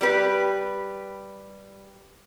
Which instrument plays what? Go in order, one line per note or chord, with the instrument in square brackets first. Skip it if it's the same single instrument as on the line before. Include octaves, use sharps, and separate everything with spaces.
[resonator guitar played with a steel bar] G3 G4 B4